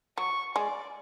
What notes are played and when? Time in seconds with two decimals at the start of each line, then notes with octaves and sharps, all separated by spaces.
0.18 F#3 C#6
0.55 G#3 D5